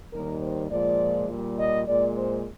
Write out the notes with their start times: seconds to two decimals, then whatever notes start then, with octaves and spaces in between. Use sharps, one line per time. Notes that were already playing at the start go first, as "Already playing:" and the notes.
0.12 D#2 D#3 G3 A#4
0.41 C5
0.70 A#2 F3 G#3 D5
1.29 A#2 G3
1.59 D#5
1.87 A#2 G#3 D5
2.17 C5